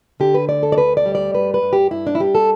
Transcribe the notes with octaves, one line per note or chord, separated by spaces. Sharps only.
D3 G4
B4
D2 D5
A4
D5
D2 B4
D5
G3
D5
G2 B4
B4
G2
G4
G2 E4
D4
E4
G3 G4
A4